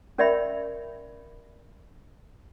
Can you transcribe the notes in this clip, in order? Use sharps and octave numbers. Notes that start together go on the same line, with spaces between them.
C#4 A#4 D5 E5 G5 B5